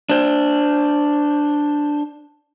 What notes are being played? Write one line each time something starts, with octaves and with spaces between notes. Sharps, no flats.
D4 C5